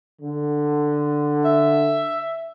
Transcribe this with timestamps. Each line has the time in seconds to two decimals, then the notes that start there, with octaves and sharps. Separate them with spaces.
0.21 D3
1.44 E5